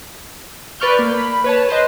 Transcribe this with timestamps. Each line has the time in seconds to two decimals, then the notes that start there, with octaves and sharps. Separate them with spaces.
0.80 B4 D5 C#6 F6 G6
0.99 A#3
1.14 B5
1.44 B4 C#5 A5
1.69 B4 C5 D#5